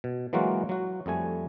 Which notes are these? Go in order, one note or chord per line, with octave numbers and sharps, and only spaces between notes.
B2
E3 F#3 G#3 A#3 F4 F#4
F#3 F#4
F2 G3 A3 G#5